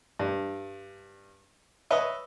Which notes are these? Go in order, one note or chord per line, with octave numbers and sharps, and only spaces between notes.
G2
B4 C#5 D#5 E5